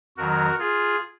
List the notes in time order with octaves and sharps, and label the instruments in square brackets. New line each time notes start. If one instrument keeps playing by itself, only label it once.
[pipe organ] F2 D#3 F#3 F#4 A#4
F4 G#4